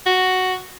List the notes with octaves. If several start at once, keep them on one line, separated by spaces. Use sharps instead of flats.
F#4